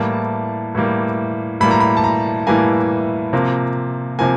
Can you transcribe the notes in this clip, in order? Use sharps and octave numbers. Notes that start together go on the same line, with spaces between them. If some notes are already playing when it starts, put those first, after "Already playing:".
Already playing: A2 E3 G3 A#3 A5
A2 E3 G3 A#3
A2 E3 G3 A#3 B5
A#5
B5
A5
A#5
A2 E3 G3 A#3 G#5
C3 F3 A#3
C3 F3 A#3 G#5